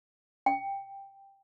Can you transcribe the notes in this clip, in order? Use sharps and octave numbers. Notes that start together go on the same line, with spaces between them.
G5